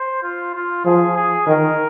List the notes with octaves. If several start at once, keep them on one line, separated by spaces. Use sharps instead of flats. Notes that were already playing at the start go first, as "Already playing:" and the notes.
Already playing: C5
F4
F4
F3 G#4
G#4
D#3 A#4